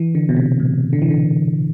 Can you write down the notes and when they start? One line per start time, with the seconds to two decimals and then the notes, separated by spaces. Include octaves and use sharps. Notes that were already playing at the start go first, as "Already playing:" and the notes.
Already playing: E3
0.15 D3
0.29 B2
0.37 C3
0.60 A2
0.93 D3
1.02 E3
1.10 D3